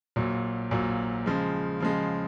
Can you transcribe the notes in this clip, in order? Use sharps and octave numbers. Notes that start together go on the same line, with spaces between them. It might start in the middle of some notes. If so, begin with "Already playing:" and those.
A#1 A#2 F#3
A#1 A#2 F#3
C#3 F3 G#3
C#3 F3 G#3